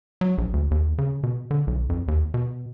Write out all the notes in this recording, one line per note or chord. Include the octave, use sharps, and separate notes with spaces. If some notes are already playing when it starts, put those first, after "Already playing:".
F#3
A#1
D2
D#2
C#3
B2
D3
B1
F2
D#2
B2